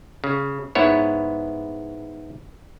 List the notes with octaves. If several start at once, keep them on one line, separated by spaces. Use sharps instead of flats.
C#3
G#2 B3 E4 C#5